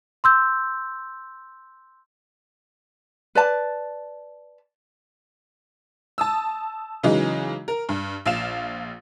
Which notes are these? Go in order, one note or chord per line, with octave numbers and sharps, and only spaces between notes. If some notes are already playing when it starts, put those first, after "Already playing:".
C6 E6 G6
B4 D5 A5
A5 D#6 E6
C#3 E3 F#3 G#3 D#4
A#4
G2
A#1 F5 E7